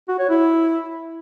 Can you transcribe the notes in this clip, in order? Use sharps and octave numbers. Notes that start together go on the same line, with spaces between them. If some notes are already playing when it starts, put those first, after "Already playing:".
F#4
C#5
E4